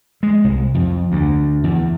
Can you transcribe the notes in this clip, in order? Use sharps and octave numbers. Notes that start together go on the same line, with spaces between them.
G#3
C2
F2
D2
E2